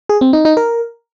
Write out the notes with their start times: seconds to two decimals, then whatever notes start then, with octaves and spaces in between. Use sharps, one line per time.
0.09 G#4
0.21 C4
0.33 D#4
0.45 D#4
0.57 A#4